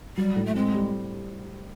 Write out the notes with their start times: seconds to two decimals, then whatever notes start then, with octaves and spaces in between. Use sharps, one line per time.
0.17 F#3 G3
0.36 A2
0.46 A3
0.55 G#3 C4
0.74 G3